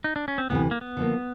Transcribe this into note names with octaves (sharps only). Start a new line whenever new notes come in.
D#4
D4
C#4
C4
D2 C3 E3 B3
A#3
B3
D3 F3 A#3